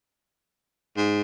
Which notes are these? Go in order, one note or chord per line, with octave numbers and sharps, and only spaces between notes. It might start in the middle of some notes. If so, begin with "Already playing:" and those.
G#2